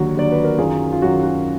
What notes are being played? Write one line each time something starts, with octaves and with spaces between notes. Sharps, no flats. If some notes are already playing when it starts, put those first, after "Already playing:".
Already playing: D#2 D3 F#3 F#4
D#2 D3 F#3 D5
B4
A#4
F#2 D#3 F#3 F4 G#4
F4
F#2 D#3 F#3 F#4
F#4